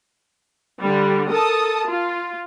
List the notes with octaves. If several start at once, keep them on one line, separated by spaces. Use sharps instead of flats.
D3 G3
A4 A#4 A5 D#6
F4